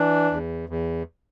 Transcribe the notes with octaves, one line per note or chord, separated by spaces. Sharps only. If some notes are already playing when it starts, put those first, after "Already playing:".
Already playing: E3 D4
E2
E2